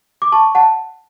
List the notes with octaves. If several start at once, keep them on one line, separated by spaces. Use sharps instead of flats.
D6
A5 C#6
F#5 A5